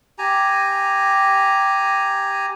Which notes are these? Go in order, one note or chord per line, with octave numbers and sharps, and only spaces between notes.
G4 G#5 A#5